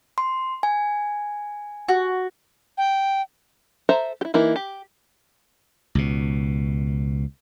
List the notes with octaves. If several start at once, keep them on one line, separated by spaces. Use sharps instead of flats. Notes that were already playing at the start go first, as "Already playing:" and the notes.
C6
G#5
F#4
G5
A4 C5 E5 A#5
E4 G4
E3 A#3 D#4 E4
G4
C#2 B2